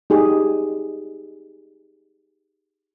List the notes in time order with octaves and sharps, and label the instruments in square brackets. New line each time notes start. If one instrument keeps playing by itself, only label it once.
[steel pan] D#4 G4 G#4